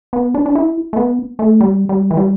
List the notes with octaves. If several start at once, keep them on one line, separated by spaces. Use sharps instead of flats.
B3
D4
D4
E4
A3
B3
A3
G3
G3
E3
G3